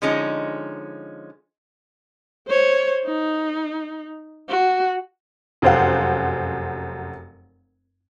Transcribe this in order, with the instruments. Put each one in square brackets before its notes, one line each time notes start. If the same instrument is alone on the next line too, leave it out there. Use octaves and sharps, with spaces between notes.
[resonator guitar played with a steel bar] D3 F3 G#3 C#4 D#4
[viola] C5 C#5
D#4
F#4
[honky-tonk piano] F1 F#2 C5 F5 F#5